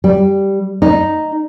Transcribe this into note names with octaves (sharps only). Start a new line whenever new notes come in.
G3
D#4